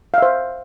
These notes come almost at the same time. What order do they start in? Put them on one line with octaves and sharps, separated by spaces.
F5 E5 C5